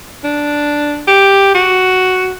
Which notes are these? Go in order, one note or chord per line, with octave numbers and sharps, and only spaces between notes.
D4
G4
F#4